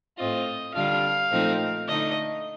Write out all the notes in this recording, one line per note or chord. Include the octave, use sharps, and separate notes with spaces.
A2 A3 C4 F4 D#5
D3 G3 D4 F4 F5
A#2 F3 A3 C4 D#4
D3 A3 D#4 D#5